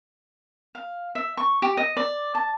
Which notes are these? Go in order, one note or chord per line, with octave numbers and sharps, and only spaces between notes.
F5
E5
C#6
G4
D#5
D5
A5